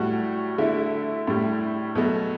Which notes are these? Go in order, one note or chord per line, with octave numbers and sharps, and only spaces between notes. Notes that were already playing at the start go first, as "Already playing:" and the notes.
Already playing: A2 G3 F#4
D3 A3 E4
A2 G3
B2 F#3 A3